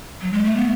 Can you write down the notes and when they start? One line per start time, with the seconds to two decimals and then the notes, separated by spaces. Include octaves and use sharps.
0.21 F#3
0.32 G#3
0.45 A3
0.56 B3